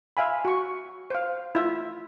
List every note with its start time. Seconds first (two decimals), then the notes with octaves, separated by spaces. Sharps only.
0.17 E5 F5 G#5 B5
0.45 F#4 C#6
1.10 C5 F5
1.55 E4 F4 E5